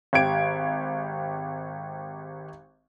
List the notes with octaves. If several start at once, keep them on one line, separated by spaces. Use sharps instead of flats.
G#1 G4 G#6 D7